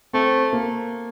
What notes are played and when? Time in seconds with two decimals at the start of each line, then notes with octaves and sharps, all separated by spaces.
0.13 A3 C4
0.53 A#3